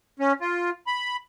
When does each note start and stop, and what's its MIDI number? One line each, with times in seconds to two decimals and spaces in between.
0.20 0.33 61
0.40 0.70 65
0.87 1.16 83